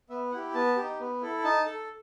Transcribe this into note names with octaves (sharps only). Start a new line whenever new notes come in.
B3 E5
E4 G4 F#5
B3 A5
G4
D#4
B3
E4 A4
D#4 A5
A4